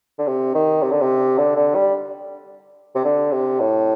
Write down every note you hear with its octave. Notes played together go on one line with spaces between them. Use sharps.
D3
C3
D#3
C3
D3
C3
D3
D3
G3
C3
D3
C3
A2